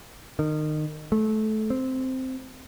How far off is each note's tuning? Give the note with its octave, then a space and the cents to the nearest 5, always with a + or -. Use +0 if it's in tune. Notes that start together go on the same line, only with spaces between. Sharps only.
D#3 -25
A3 -20
C4 -5